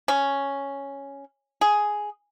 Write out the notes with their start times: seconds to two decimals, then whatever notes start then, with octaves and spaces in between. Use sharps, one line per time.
0.08 C#4
1.61 G#4